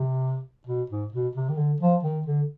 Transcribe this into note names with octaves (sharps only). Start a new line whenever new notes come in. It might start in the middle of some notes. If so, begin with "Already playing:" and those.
Already playing: C3
B2
G#2
B2
C3
D#3
D3
F3
D#3
D3